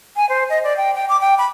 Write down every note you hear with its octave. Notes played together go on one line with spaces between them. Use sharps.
G#5
C5
D#5
D5
G5
G5
D6
G5
B5